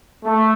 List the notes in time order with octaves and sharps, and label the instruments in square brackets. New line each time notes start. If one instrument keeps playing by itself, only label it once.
[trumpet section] A3